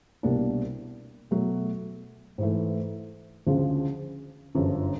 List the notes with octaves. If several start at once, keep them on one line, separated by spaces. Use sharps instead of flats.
C2 B2 G3 A#3 D4
B2 F#3 A3
G#2 E3 A3
D2 C#3 F3 G#3
G1 F#2 D3 F3 G#3